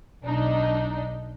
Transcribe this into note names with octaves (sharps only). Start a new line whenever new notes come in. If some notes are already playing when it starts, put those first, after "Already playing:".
B1 D4 D#4